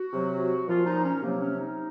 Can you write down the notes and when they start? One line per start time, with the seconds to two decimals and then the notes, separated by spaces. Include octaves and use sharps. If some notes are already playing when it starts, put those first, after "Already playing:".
Already playing: F#4
0.13 C3 F#3
0.68 A#2 F3 F4
0.86 D#4
1.05 C#4
1.22 C3 F#3 A#3
1.41 C#4
1.59 D#4